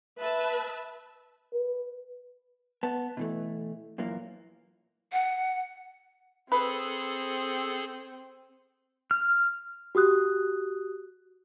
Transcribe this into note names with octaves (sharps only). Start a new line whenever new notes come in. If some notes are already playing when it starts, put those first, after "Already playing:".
B4 E5 A5
B4
B3 A5
B2 E3 A3
F#2 A#2 E3 A#3
F#5
C4 G#4 A4 B4
F6
F#4 G4 D#6 F#6